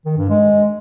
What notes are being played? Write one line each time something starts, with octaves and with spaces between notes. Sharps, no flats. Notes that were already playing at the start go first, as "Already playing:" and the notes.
D#3
G2
G#3